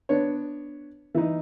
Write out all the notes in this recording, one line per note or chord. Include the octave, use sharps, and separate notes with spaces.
B3 D4 C#5
E3 D#4